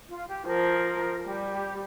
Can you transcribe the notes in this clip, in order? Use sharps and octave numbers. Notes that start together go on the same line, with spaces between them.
F4
G4
F3 A#4
G3 G4
G4